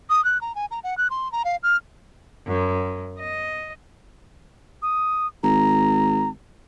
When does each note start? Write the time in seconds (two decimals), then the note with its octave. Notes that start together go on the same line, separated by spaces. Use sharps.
0.10 D#6
0.24 F#6
0.41 A#5
0.55 G#5
0.71 A#5
0.84 F#5
0.97 F#6
1.10 C6
1.32 A#5
1.45 F5
1.63 F6
2.47 F#2
3.19 D#5
4.82 D#6
5.43 G#1 A#5